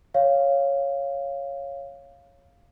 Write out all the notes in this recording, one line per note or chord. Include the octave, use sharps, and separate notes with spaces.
C#5 F5